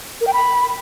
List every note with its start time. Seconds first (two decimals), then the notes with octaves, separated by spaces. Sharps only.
0.21 A#4
0.27 G5
0.33 B5